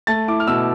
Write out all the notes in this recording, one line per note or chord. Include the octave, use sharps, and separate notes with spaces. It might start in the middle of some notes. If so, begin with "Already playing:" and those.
A3 A6
E4 D6
F6
B2 E6